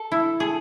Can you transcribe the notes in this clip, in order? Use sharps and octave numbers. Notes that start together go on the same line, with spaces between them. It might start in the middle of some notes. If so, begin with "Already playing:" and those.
Already playing: A4
E4
G#4